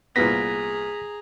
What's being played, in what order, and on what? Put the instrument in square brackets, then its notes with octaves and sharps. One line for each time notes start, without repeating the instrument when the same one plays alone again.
[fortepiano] C2 A#2 B3 [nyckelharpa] G#4 A#5 [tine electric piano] A#6 B6